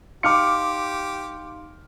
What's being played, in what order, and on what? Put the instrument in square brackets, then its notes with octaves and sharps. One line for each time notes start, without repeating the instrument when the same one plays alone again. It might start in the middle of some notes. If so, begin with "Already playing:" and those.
[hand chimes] D#4 F5 C6 [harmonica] G4 [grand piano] D6 F6 C#7